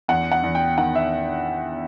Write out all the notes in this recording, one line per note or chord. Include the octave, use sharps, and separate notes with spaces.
E2 F#5
F#5
E2
G5
D#3 F#5
E5